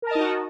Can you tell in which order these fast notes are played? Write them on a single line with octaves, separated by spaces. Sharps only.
A#4 A5 D#5 D#4 F#4